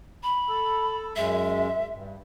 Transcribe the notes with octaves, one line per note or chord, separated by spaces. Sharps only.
B5
A4
F#2 G#3 E5
G2